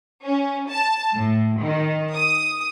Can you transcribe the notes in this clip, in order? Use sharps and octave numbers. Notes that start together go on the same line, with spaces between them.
C#4
A5
A2
D#3
D#6